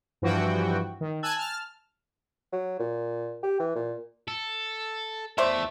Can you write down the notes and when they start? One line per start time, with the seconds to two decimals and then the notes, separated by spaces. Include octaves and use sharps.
0.22 G2 E3 F3 F#4 G5
1.01 D#3
1.23 G#5 A5 E6 F#6 G#6
1.36 A5 F6
2.53 F#3
2.79 A#2
3.43 G4
3.60 E3
3.76 A#2
4.28 A4
5.38 E2 A3 C5 D5 E5